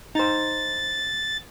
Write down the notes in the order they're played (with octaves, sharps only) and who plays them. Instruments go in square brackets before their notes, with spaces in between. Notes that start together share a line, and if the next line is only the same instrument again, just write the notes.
[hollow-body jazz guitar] D#4 C5 [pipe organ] A6